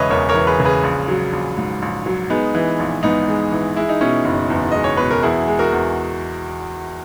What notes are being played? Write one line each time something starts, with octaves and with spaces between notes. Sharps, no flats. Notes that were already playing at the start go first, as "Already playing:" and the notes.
Already playing: E1 C#3 E3 B4 C#5 D#5 E5
E2 A#4 C#5
A#4 C#5
E3
G#4 B4
C#3
G#4 B4
A#1
F#3
A#1
G#2
A#1
F#3
G#3 B3 D#4
E3
A#1
G#2 B3 D#4
G#3
E3
G#3 E4
D#4
B2 C#4 E4
F#1
E2
G#3 D#5
C#5
B2 B4
A#4
E2 E4 G#4
G#3
F#4 A#4
E2